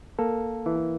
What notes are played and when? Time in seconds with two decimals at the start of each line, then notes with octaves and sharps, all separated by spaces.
0.19 A#3 A4
0.66 E3